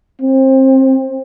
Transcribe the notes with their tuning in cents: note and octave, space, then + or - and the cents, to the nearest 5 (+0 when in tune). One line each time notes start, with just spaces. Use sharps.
C4 +25